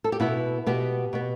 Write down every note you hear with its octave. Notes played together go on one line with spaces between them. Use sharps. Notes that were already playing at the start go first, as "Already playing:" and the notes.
A4
G4
B2 B3 E4
B2 B3 G4
B2 B3